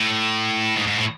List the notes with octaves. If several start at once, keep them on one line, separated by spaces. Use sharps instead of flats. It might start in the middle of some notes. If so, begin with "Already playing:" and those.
Already playing: A2
G#2
G#2
A2